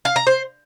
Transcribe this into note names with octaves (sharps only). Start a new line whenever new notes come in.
F5
A#5
C5